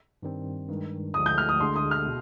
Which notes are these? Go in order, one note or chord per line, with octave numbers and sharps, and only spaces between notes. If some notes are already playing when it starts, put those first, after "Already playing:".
G2 D#3 G3 C4
G2 D#3 G#3
D2 D3 F3 G#3 D#6
G6
F6
D#6
D2 D3 G#3 D4 G#4 C6
D#6
F6
B2